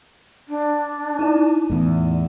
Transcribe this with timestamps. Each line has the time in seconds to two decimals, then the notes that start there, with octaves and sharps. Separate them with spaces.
0.49 D4
1.19 D#4 E4 D5
1.70 E2 A2